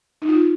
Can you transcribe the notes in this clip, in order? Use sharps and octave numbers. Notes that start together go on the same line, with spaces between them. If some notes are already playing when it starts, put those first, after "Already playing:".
D#4
F4